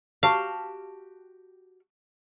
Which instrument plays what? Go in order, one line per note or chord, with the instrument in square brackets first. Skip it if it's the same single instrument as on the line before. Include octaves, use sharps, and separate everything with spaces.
[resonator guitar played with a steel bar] F#4 G4 A5 [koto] F5